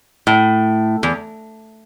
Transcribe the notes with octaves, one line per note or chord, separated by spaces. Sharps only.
A2
E2